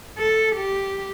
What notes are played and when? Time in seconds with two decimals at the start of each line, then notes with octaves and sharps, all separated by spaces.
0.18 A4
0.56 G4